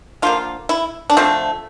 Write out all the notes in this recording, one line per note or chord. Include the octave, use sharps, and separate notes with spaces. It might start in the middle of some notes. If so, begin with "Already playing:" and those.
D3 F3 A#3 F4
E4
D4
D3 F3 A3 C4